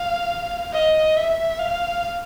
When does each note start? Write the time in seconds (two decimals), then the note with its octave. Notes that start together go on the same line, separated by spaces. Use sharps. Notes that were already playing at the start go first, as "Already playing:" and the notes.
Already playing: F5
0.73 D#5
1.16 E5
1.59 F5